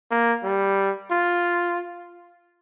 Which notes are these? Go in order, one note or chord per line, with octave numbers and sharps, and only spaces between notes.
A#3
G3
F4